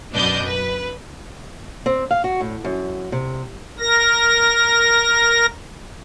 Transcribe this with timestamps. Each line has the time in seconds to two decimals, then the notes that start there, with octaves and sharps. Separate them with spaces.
0.13 F#2 B2 D4 D5 D#5 G6
0.47 B4
1.86 C4
2.11 F5
2.24 F#4
2.41 A2
2.64 F#2
3.12 C3
3.79 A#4 A#6